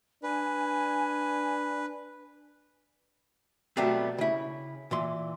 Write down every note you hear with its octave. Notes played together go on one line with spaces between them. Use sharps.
D4 B4 G#5
B2 F#3 G3 A3 B3 C4
C#3 E4
A#2 E3 C6